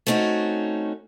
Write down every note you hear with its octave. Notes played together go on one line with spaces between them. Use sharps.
A3 C4 C#4 D#4 F#4